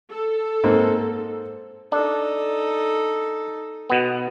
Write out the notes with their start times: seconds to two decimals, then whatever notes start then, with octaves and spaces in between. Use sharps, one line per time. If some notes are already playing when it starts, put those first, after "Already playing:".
0.11 A4
0.64 G#2 A#3 C4
1.92 D4 D#4 A4
3.90 B2 B3